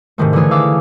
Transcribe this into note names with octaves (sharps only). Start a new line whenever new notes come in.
G#2 C3 D#3 A3
D3 E3 A3 G#4
F5 D6 E6